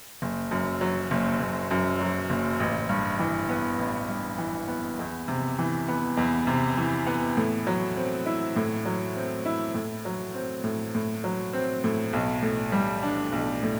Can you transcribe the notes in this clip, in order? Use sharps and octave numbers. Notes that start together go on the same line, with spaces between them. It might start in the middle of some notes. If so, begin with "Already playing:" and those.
F#1
F#2
F#3
F#1
F#1
F#2
F#3
F#1
A1
G2
E3
B3
A1
G2
E3
B3
E2
C3
E3
B3
E2
C3
E3
B3
A2
F#3
C4
E4
A2
F#3
C4
E4
A2
F#3
C4
A2
A2
F#3
C4
A2
B1
A2
G3
D4
B1
A2